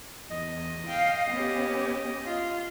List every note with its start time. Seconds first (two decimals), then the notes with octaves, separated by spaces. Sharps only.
0.30 E2 D#5
0.86 F5 G5
1.30 B3 C#4 G4
2.23 F4